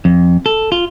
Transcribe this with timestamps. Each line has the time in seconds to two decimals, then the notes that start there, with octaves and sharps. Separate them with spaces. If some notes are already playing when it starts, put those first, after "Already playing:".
0.05 F2
0.46 A4
0.72 F4